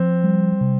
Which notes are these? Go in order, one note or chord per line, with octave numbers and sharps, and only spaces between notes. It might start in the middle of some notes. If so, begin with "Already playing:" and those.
Already playing: F3 C4
G3
C3